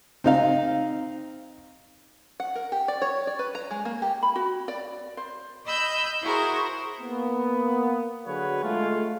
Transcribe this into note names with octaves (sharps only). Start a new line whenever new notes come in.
C4 D#4 F5
F#5
A#4
G4
D5
C#5
D5
B4
A#5
G#3
A#3
G4
B5
F#4
D5
C5
D#5 B5 E6 G6
E4 F#4 G#4 A#4 C5
A#3 B3
D3 F#3 F#4 G#4 B4 C#5
G#3 A3 F4